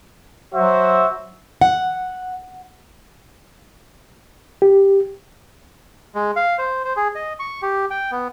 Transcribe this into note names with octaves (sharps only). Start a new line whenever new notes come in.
F#3 F#4 C5 E5
F#5
G4
G#3
F5
C5
C5
G#4
D#5
C#6
G4
G5
B3